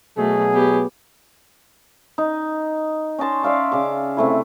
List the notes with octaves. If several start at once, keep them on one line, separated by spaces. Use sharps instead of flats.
B2 F#3 A3 G#4
B3 G4
D#4
C#4 D#5 A5 C6
D5 E5 F5 C6
C#3 D6
C3 A3 E4